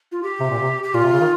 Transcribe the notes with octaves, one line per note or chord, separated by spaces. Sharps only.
F4
G4
C3
A#2
C3
G4
A#2 F4
C3
C#3
D#3